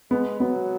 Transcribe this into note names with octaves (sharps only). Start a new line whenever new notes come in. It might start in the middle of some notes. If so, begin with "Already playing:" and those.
G#3 B3
F#3 B3